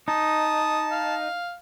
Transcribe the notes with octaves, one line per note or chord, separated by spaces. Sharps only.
D#4 A5 D#6
F5